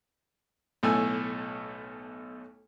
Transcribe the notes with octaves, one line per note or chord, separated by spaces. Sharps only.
B1 A2 A3 G#5 E6